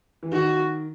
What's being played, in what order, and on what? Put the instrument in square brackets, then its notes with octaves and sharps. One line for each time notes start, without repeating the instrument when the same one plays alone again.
[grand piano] E3
[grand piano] D#3 [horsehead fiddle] F#4